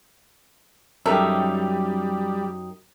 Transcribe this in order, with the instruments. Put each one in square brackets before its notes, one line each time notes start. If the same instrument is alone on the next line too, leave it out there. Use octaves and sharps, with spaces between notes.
[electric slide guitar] F#2 D#4 G4 [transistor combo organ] G3 [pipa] A4 A#4 E5